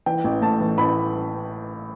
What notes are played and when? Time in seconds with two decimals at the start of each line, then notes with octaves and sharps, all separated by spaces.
0.06 E3 G5
0.24 A1
0.42 A2 A5
0.60 E3
0.78 A1 B5